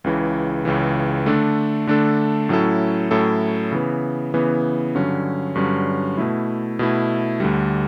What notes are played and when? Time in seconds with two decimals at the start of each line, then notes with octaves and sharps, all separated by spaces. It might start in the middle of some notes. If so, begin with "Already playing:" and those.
0.04 C#2 C#3 E3
0.65 C#2 C#3 E3
1.26 D3 A3 D4 A4
1.87 D3 A3 D4 A4
2.49 A2 F#3 C#4 E4 A4
3.11 A2 F#3 C#4 E4 A4
3.72 C#3 E3 B3
4.34 C#3 E3 B3
4.95 G2 D3 F#3 C#4
5.55 G2 D3 F#3 C#4
6.17 B2 A3 E4
6.79 B2 A3 E4
7.40 D2 D3 G3